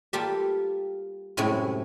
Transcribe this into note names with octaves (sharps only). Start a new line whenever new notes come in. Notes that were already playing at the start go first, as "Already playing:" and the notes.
G3 A#3 F4 G4 A4 E5
F#2 A2 C3 G#3 E4 C#5